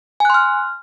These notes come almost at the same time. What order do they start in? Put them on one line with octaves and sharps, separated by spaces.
G#5 F#6 C6 F6